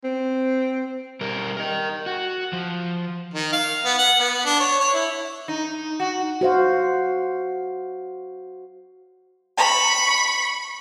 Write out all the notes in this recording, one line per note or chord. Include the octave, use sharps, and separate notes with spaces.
C4
G3 A#4
A#4 D#5
F#4
F3
D#3
F5
B3
F#5
B3
D4
C#5
C#5
E4
D#4
F#4
F#4 C5 F5
B5 C#6